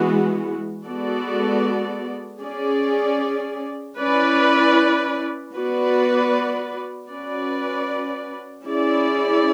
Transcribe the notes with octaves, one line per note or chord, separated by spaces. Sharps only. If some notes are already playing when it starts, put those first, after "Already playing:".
Already playing: E3 G#3 B3 F#4
G#3 B3 F#4 A4 D5
C#4 G#4 D5
C#4 E4 B4 D5
B3 F#4 B4 D5
C#4 F#4 B4 D5
C#4 E4 G#4 D5